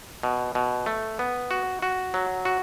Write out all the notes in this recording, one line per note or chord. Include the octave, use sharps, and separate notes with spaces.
B2
B2
A3
B3
F#4
F#4
F#3
F#4